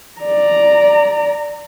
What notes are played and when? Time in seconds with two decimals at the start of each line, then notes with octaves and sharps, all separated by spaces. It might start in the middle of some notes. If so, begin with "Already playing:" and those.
0.21 D5 A#5